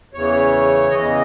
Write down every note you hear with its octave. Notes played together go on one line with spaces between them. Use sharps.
E2 C#3 E3 C#5
E2 C#3 E3 D#5